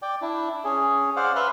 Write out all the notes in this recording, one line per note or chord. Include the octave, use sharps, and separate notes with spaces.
D5 G5
D4 E4
C#4 G#4
C5 D5 F5 F#5
B4 E5 C6 F6 F#6